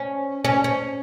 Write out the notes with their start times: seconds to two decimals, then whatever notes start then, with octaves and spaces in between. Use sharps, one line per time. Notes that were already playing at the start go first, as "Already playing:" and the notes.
Already playing: C#4
0.45 C#4
0.64 C#4